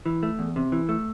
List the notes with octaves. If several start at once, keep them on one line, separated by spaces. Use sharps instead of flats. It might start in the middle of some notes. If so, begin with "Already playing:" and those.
E3
A3
E2
C3
E3
A3